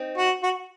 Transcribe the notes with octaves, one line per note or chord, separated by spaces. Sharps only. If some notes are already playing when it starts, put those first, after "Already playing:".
Already playing: C4 D#4
F#4
F#4